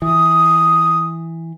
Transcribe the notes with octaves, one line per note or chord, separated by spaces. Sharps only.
E3 D#6